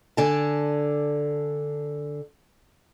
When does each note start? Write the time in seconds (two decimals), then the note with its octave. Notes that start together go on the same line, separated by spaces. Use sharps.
0.17 D3 D5 G#5 A5